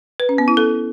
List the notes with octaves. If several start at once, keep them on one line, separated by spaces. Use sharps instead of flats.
B4
C#4
B3
E4
A4